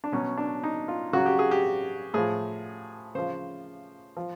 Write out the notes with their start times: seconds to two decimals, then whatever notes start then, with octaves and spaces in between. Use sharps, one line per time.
0.04 D4
0.12 B2 F#3 C#4
0.38 D4
0.64 D#4
0.88 F4
1.13 C#3 F#3 F#4
1.26 G4
1.39 G#4
1.51 G4
2.14 A2 F3 G#4
3.15 C#3 F3 C5
4.17 F3